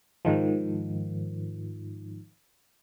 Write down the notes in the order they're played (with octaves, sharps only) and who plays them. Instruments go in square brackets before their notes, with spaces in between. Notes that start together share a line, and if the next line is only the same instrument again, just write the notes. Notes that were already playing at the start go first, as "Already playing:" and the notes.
[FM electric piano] G#2 D#3 F3